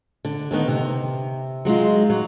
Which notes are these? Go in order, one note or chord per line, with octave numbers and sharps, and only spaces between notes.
D3
D3 D#3 B3 D#4
C3
F#3 G#3 D#4 F4
F#3